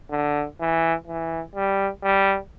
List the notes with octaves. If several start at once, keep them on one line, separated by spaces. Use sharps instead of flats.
D3
E3
E3
G3
G3